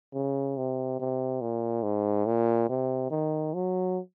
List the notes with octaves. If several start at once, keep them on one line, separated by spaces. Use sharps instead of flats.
C#3
C3
C3
A#2
G#2
A#2
C3
D#3
F#3